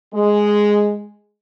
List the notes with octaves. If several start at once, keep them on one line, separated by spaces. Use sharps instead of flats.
G#3